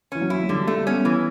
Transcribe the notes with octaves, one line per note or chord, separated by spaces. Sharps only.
E3 C#4
F#3
E4
F#3
D3 G3
G3 A3
B3 C#4
E3